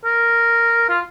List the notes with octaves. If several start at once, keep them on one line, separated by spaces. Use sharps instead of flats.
A#4
F4